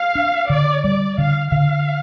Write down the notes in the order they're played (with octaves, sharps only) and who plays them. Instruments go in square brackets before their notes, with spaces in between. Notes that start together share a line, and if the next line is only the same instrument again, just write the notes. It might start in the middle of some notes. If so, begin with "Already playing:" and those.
Already playing: [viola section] F5
[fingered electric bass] D4
[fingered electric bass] D3 [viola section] D5
[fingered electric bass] G3 [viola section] D5
[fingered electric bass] D3 [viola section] F5
[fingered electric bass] D3 [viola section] F5